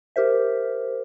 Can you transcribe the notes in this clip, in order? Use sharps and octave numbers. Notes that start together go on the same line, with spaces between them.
G4 A#4 C5 E5